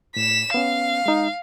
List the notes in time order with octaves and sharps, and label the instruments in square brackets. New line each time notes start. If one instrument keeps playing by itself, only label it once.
[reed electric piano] A2 [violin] B6 E7
[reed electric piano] B3 C#4 [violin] F5
[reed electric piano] G#3 D#4